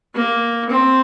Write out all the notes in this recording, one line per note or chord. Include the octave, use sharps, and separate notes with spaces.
A#3
C4